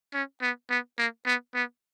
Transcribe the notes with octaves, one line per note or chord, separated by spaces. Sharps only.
C#4
B3
B3
A#3
B3
B3